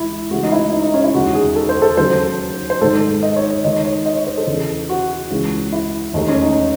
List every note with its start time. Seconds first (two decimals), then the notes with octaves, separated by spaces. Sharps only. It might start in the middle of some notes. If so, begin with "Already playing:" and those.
Already playing: C#2 E3 G#3 E4
0.31 C#2 C#3 E3 A3 F#4
0.43 D#4
0.52 E4
0.72 D#4
0.83 D#4
0.94 C#4
1.03 E4
1.14 E1 D#2 D#3 F#4
1.35 G#4
1.56 A4
1.69 C5
1.82 A4
1.97 D#2 C#3 F#3 C5
2.70 C5
2.81 G#1 G#2 D#3 G#3 A4
3.23 D#5
3.36 C#5
3.51 C#5
3.64 D#2 D#3 G#3 D#5
3.85 C#5
4.06 D#5
4.16 C#5
4.27 C5
4.37 A4
4.47 E2 C#3 E3
4.89 F#4
5.31 C#2 C#3 E3
5.72 E4
6.14 E1 D#2 D#3 A3 D#4
6.28 C#4
6.42 D#4